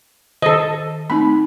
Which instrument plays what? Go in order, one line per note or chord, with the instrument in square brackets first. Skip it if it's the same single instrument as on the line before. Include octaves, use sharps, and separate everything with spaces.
[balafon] D#3 [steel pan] A4 D#5
[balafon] A3 C4 D#4 [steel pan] B5